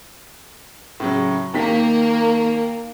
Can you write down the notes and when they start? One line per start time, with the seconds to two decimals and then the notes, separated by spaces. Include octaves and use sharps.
1.00 A2 C#3 F#3
1.54 D#2 D#3 A#3 B6